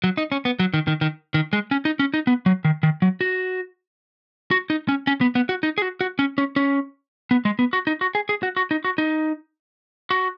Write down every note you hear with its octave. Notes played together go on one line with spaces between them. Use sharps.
F#3
D#4
C#4
B3
F#3
D#3
D#3
D#3
D#3
G#3
C#4
D#4
C#4
D#4
B3
F#3
D#3
D#3
F#3
F#4
F#4
D#4
C#4
C#4
B3
B3
F#4
D#4
G#4
F#4
F#4
C#4
C#4
C#4
B3
G#3
B3
F#4
D#4
F#4
G#4
G#4
F#4
F#4
D#4
F#4
D#4
F#4